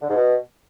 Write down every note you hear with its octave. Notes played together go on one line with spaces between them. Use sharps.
D3
G#2
B2